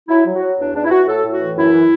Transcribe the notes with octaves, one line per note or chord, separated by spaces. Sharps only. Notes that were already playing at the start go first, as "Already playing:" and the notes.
F#3 E4
F#3
F#4
F#3
E2 D4
E2 D4
E4
E3 F#4
A2 A4
A2
F#4
E3
F#2 E4
E3